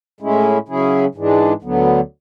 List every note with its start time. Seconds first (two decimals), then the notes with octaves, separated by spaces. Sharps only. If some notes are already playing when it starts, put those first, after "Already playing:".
0.20 A2 G#3 C#4 E4
0.68 C#3 F#3 C#4 E4 G#4
1.15 G#2 E3 G#3 D4
1.62 D2 D3 F#3 B3